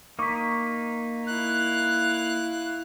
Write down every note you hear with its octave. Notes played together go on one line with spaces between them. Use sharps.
A#3 D#4 C#6 D6 B6
E4 F5 F#6